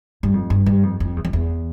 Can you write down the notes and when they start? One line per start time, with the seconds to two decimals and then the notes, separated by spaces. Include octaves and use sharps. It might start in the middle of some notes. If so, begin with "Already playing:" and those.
0.23 G2
0.34 F2
0.50 G2
0.66 G2
0.83 F2
1.00 F2
1.16 E2
1.25 F2
1.33 E2